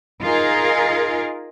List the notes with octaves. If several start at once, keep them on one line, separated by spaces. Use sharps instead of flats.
D#4 F4 G#4 A#4